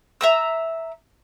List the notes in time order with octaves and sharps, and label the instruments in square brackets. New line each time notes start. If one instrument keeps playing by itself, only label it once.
[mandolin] E5 A#5 E6